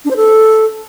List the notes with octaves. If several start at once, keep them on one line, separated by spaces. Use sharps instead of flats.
D4
C5
A4